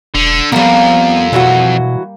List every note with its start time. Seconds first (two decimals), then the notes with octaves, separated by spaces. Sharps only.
0.15 E1 D3
0.52 C2 F2 G3 A#3 B3
1.33 B2 E3 F#3 F#4